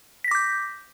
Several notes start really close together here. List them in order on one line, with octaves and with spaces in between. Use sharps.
B6 A#6 D6 G6